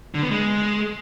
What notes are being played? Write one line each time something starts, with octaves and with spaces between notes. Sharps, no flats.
D3
B3
G#3